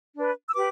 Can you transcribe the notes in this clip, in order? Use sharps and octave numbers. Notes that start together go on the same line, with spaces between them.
D4 B4
E6
G4 B4 D6